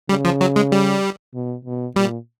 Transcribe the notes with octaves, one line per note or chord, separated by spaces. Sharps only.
C#3 G3
F3
F#3
G#3
G3
B2
B2
A#2 G3